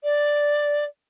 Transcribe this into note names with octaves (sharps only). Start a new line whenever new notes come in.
D5